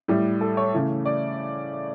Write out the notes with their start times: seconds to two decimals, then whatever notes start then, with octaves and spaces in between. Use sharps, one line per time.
0.08 A2 G3
0.41 A4
0.57 C#5
0.74 C#3 E3 A3
1.05 D5